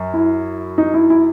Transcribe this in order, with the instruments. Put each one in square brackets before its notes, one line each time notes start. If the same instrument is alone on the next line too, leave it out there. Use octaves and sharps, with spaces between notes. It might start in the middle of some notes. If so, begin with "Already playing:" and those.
Already playing: [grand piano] F#2
[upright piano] E4
D#4
E4
E4